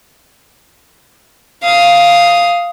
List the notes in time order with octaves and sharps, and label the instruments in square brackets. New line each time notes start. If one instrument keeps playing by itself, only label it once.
[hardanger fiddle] F5 D#6